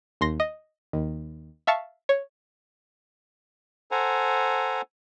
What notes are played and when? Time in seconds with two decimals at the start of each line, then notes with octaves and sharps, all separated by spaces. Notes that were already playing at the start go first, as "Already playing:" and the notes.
0.21 D#2 C6 A#6
0.40 D#5
0.93 D#2
1.67 E5 F5 A5 C#6
2.09 C#5
3.91 A4 C5 F#5 G#5 A#5